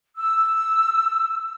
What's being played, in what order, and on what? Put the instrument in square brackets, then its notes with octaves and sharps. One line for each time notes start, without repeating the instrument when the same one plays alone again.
[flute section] E6